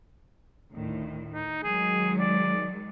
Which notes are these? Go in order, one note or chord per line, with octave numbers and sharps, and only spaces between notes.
D2 A2 D#3
D#4
D#3 F#3 G#3 G#4
D5